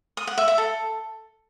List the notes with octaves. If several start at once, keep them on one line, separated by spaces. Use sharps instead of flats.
D#6
F#5
E5
E5
A4